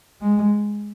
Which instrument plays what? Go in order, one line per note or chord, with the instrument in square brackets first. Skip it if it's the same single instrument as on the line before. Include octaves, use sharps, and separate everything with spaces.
[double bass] G#3